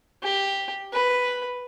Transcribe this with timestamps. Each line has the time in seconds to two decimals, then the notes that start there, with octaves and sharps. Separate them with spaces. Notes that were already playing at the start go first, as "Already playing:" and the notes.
0.23 G4
0.93 B4